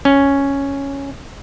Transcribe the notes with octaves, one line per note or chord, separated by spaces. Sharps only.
C#4